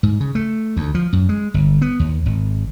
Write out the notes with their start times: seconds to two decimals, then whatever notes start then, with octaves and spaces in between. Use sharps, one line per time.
0.03 G#2
0.20 C#3
0.35 A3
0.77 D2
0.95 F3
1.13 F#2
1.29 G#3
1.54 G1
1.82 B3
2.00 D#2
2.26 G#1